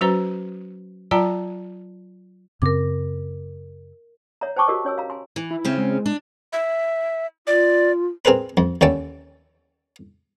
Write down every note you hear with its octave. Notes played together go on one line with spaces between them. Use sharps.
F#3 C#4 F#4 B4 C5 A#5
F#3 F4 D5 G5 A5 A#5
F#2 C#3 C4 A#4 D6
C#5 E5 F#5 A#5
C5 G5 A5 C#6 D6 E6
F#4 G4 A#4 D#5
C#4 C#5 G#5 E6
F5 A#5
G#5 C6
E3
E4
C#3 C4 C#4
G#3
D4
E5
F4 D5
C4 G#4 A#4 B4 B5
F2
D#2 D3 C#4 G5 A5